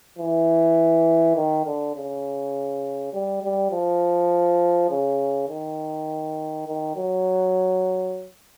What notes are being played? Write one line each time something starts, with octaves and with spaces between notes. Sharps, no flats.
E3
D#3
D3
C#3
G3
G3
F3
C#3
D#3
D#3
F#3